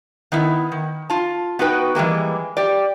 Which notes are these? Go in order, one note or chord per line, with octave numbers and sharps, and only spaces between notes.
D#3 B3 E4
D#3
F4 A5
B3 D#4 F#4 B4 G5
E3 G3 G#3 A#3
G4 D5